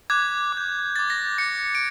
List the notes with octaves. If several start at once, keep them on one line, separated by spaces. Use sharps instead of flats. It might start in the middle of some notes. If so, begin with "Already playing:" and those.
D6 F#6 G#6
D6 G6
D6 G6 A6
A#6
D6 G6 C#7
D7